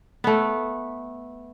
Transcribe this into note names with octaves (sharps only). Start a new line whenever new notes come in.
A3 B3